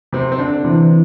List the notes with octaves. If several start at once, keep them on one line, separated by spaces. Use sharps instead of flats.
C3 C4
C4
D3 D4
C3 E3 C4